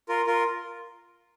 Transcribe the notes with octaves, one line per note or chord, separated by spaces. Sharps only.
F4 A#4
F4 A#4